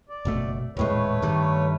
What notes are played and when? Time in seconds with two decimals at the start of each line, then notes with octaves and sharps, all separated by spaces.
0.09 D5
0.25 F#1 B2 A3
0.77 D#1 A2 G#3 A3 B4 C#5
1.22 G2 D#3 G3